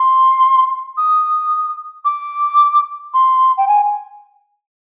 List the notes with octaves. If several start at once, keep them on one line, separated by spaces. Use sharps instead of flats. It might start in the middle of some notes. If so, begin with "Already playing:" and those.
Already playing: C6
D#6
D6
C6
G5
G#5